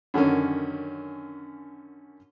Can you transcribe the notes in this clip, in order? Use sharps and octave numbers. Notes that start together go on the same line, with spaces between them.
F#2 D3 D#3 C#4